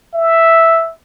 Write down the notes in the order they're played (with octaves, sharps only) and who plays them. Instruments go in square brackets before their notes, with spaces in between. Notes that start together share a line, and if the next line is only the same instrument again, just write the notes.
[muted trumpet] E5